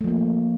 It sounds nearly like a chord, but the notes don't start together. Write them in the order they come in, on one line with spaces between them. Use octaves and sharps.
A3 F3 A#3